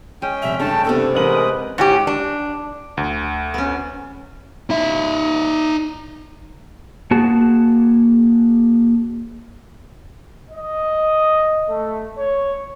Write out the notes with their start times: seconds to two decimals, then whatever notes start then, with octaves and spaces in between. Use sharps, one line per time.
0.22 G#3 C#4 G5
0.42 F1 E5 F7
0.60 G2 C#3 A3 A5
0.85 C3 B3 D4 A4
1.15 A1 G#3 A#4 B4 D#6 D#7 F#7
1.78 G#2 C#4 G4
2.07 D4
2.97 D2
3.54 B3 C#4
4.70 D#4 E5
7.11 A#3 F#4 G#4 A5
10.50 D#5
11.70 A3
12.17 C#5